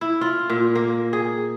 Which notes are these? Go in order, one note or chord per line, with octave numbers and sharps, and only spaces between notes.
E4
F4
A#2
A#3
G#4